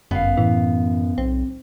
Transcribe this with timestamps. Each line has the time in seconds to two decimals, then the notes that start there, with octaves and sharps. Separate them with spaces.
0.11 G1 F#2 B3 F5
0.37 A2 E3
1.18 B1 C4